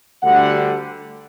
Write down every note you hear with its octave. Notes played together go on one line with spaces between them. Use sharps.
D2 D3 G3 D4 F#5